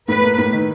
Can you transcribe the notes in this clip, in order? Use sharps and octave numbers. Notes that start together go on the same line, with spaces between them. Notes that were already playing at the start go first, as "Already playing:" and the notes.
A2 B4
A#3
A2
D#3